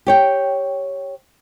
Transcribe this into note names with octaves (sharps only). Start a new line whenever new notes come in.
G4 C#5 G5